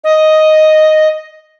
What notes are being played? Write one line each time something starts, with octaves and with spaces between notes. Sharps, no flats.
D#5